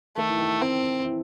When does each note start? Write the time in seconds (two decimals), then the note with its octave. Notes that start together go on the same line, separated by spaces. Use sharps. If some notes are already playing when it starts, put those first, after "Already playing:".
0.17 D#3 A3
0.28 E3
0.38 D#3
0.61 C4
1.05 E3